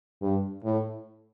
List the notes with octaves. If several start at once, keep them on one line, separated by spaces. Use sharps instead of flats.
G2
A2